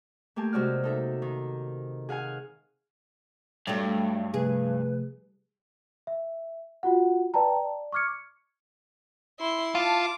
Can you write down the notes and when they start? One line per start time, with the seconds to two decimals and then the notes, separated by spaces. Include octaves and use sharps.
0.36 A3 A#3 G4 G#5 A5
0.53 C3 G#3 F#4 D5 F6
0.84 D#4 A4 E5
1.22 D#3
2.09 G#4 F5 F#5 G#5
3.67 G2 F#3 G3 A3 G5
4.34 C3 F3 A3 G#4 B4
6.07 E5
6.83 F4 F#4 F#5
7.34 B4 D5 G5 A5 A#5
7.56 D5
7.92 C#6 D6 F6 G#6 C#7
9.40 E4 C6
9.75 F4 A5 D6